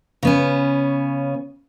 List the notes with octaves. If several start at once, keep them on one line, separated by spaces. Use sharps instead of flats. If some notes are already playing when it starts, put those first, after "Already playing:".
C#3 B3 C#4